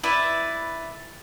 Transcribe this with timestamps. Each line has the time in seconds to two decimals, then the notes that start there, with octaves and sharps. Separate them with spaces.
0.03 E4 B4 D5 E5